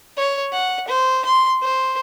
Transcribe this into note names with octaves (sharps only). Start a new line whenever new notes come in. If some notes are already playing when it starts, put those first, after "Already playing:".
C#5
F#5
C5
C6
C5